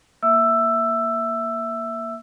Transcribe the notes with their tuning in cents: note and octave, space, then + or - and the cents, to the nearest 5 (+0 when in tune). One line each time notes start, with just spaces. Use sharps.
A#3 +0 E5 +0 E6 +10